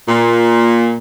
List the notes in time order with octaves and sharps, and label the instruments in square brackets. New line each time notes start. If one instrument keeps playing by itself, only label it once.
[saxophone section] A#2